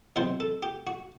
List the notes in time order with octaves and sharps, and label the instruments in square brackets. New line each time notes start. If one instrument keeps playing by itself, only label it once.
[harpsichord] E2 B2 F#3 C4 C5
A4
G4
F#4